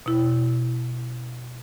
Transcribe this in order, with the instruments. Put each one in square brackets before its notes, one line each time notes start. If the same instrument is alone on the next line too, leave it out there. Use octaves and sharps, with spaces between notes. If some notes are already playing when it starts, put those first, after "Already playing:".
[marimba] B2 E4